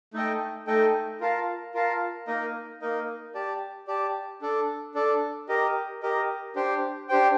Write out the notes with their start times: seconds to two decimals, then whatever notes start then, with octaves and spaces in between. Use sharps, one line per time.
0.14 A3 D#4 A4 D#5 G5
0.67 A3 D#4 A4 D#5 G5
1.20 F4 A#4 F5 A5
1.74 F4 A#4 F5 A5
2.27 A#3 D#4 A#4 D#5
2.81 A#3 D#4 A#4 D#5
3.35 G4 D5 A5
3.87 G4 D5 A5
4.41 D4 A4 D5
4.95 D4 A4 D5
5.49 G4 A#4 D#5
6.02 G4 A#4 D#5
6.56 D4 G4 C5 G5
7.09 D4 G4 C5 G5